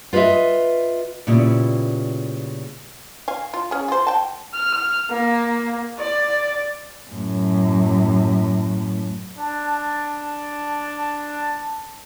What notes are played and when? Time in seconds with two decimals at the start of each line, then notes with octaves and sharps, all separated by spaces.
0.13 F4 B4 C5 D#5 E5
1.27 A#2 C#3 G3 B3 E4
3.28 F5 G#5
3.54 F4
3.71 C#4 G#4
3.88 F4 C5
4.07 G5 A5
4.54 F6
5.11 A#3
5.99 D5
7.12 F#2 A2
9.39 D4 A5